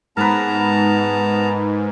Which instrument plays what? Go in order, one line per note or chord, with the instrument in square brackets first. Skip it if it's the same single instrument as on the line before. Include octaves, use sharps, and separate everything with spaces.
[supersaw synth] G#2 [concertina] B3 A5 A#5 [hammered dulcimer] A#4 B4